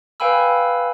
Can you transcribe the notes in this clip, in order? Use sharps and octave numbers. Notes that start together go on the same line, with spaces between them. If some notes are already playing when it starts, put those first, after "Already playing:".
B4 F5 G5 G#5 B5 E6